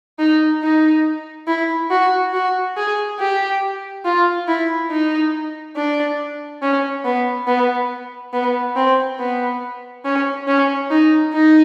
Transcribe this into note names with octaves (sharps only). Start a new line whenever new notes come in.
D#4
D#4
E4
F#4
F#4
G#4
G4
F4
E4
D#4
D4
C#4
B3
B3
B3
C4
B3
C#4
C#4
D#4
D#4